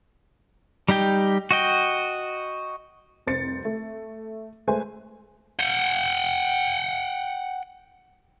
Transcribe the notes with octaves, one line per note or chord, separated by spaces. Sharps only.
G3 D#4 G4 G5
F#4 D#5 G5
F1 C2 C5 A6 C#7
A3
G#3 A3 B4 C5 G#5
F#5 G5